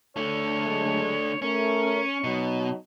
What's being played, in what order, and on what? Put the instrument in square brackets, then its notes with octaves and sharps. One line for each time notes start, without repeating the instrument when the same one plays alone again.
[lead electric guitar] D3 A3 [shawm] C#5
[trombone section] F#3 G#3
[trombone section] A3 A#4 [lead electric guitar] C#4 [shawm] C#6
[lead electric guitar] B2 [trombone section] F#3 D#4